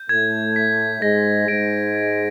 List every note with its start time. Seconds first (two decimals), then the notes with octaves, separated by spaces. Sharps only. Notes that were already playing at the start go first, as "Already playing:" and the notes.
Already playing: G6
0.09 A2 A3 G#6
0.56 B6
1.02 G#2 G#3 A#6
1.48 G#2 G#3 D7
1.95 A6